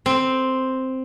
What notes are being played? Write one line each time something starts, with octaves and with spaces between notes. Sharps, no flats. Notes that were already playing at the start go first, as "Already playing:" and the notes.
C4